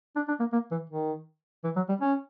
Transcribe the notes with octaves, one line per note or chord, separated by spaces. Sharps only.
D4
D4
A#3
A#3
E3
D#3
E3
F#3
G3
C#4